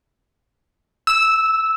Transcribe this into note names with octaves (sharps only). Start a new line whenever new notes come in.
E6